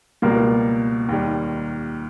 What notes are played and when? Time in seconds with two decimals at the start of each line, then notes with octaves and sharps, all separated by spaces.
0.22 C#2 B2 G3 A#3 A#4
1.09 D#2 D#3 G3